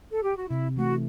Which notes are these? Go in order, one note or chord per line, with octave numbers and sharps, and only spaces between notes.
A4
G4
F#4
C3 E4
E3 A3 F#4